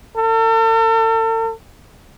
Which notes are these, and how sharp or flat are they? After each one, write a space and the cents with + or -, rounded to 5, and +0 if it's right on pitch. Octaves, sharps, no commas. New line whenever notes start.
A4 +40